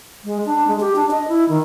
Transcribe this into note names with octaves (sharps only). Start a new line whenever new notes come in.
G#3
D4
G#3
G4
D4
D#5
E4
D#3